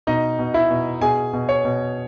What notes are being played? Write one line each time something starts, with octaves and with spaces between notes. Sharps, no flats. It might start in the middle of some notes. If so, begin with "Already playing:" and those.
B2 D#4 D#5
B2
E4 E5
B2
B2 G#4 G#5
B2
C#5
B2